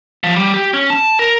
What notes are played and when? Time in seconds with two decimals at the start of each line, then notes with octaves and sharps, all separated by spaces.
0.24 F3
0.36 G3
0.54 G4
0.74 C#4
0.90 A5
1.19 A#4